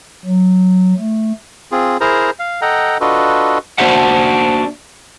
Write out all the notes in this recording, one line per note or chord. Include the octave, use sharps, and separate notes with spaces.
F#3
A3
C4 F4 G#4
E4 G#4 A#4 C5 A#5
F5
A4 D#5 F#5 G5 A#5
D4 F4 F#4 A4 B4 D#5
A#3 D4 F#4 C5 E5 F#5